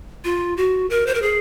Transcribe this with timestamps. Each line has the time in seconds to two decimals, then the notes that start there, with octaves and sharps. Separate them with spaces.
0.24 F4
0.57 F#4
0.90 A#4
1.06 C5
1.14 A#4
1.22 G#4